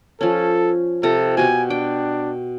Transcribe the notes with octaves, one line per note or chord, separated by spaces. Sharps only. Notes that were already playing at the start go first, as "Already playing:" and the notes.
F3 C#4 A4
C3 F4 A4 A#5
B2 F#4 G4 G#5
D4 G5